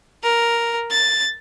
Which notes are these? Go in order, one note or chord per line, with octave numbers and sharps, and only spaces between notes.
A#4
A6